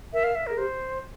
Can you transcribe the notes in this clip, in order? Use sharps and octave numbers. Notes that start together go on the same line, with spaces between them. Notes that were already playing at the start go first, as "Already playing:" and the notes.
A#4 E5
F5
E5
G#4 A#4
G4 C5